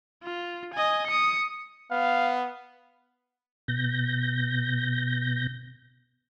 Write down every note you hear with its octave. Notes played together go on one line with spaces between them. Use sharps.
F4
D#5 G#5
D#6 C#7
B3 F5
B2 G6 A#6